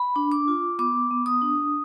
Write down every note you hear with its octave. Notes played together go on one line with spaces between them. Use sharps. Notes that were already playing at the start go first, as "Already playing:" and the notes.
Already playing: B5
D4
D6
F4
B3 D6
B3
D#6
D4